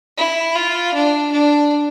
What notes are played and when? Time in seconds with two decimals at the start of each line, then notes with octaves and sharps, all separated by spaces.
0.18 E4
0.56 F4
0.94 D4
1.32 D4